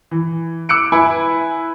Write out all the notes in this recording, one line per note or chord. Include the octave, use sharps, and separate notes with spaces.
E3
D6 E6 F#6 C#7 D7
E4 B4 G#5